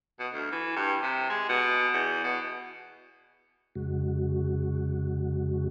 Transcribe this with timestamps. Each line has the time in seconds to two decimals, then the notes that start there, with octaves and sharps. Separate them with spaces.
0.19 B2
0.33 D2
0.52 E3
0.76 G2
1.03 C3
1.30 G#3
1.49 B2
1.94 E2
2.24 B2
3.75 F2 C#3 G#3 F#4